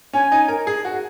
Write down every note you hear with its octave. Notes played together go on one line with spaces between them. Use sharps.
C#4 G#5
D#4
A#4
G#4
F#4